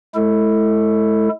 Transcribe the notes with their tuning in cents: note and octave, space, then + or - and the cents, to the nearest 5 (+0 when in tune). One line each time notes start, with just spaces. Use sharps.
G#3 +40 E4 +0 A4 +20